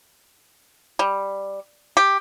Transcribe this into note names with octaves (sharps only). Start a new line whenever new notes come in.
G3
G4